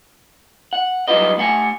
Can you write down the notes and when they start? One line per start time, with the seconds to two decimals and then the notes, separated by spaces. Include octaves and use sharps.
0.73 F#5
1.08 F#3 G3 D#4 F4 B4 D#5
1.38 A3 F#5 G#5